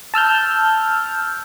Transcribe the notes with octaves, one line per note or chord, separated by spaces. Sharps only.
A5 E6 F6 G6